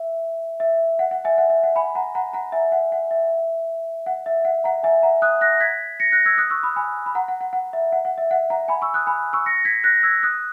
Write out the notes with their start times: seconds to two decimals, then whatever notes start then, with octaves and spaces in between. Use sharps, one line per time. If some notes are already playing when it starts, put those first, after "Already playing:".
Already playing: E5
0.60 E5
0.99 F#5
1.11 F#5
1.25 E5 G#5
1.38 F#5
1.50 E5
1.63 F#5
1.76 G#5 B5
1.95 F#5 A#5
2.15 F#5 A#5
2.33 F#5 A#5
2.52 E5 G#5
2.72 F#5
2.92 F#5
3.11 E5
4.06 F#5
4.26 E5
4.45 F#5
4.64 F#5 A#5
4.83 E5 G#5
5.03 F#5 A#5
5.22 D#6 F#6
5.41 F#6 A#6
5.60 G#6 B6
6.00 A#6 C#7
6.12 F#6 A#6
6.26 E6 G#6
6.38 D#6 F#6
6.50 C#6 E6
6.63 B5 D#6
6.76 G#5 B5
7.06 B5
7.15 F#5 A#5
7.28 F#5
7.41 F#5
7.53 F#5
7.73 E5
7.92 F#5
8.05 F#5
8.18 E5
8.31 F#5
8.50 F#5 A#5
8.68 G#5 B5
8.82 C#6 E6
8.94 D#6 F#6
9.07 G#5 B5
9.33 C#6 E6
9.46 A#6 C#7
9.65 G#6 B6
9.84 F#6 A#6
10.03 E6 G#6
10.23 D#6 F#6